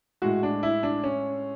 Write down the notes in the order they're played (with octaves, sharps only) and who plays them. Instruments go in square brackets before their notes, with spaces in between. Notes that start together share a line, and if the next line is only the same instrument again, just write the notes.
[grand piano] A2 G#3 F#4
D4
E4
D4
C#4